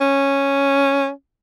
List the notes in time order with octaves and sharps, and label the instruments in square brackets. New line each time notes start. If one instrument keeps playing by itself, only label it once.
[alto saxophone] C#4